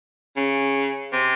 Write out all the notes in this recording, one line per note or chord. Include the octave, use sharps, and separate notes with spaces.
C#3
C3